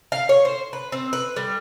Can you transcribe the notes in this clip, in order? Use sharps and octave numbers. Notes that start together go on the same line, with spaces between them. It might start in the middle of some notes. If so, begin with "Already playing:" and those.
F5
C#5
C5
B4
C4
B4
G3